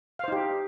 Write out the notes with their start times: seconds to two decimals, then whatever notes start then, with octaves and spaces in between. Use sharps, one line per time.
0.19 F5
0.24 C5
0.28 D#4
0.32 G4